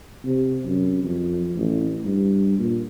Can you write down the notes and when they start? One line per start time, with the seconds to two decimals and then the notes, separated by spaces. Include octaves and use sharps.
0.25 C3
0.66 F#2
1.03 F2
1.56 A1
2.05 G2
2.59 A#2